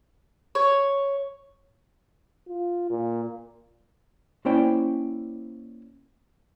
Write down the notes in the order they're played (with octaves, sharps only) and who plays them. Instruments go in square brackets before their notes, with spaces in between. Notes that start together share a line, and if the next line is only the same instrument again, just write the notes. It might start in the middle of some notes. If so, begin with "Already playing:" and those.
[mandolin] C#5
[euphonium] F4
A#2
[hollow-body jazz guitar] A#3 C#4 E4 C5 D5 G5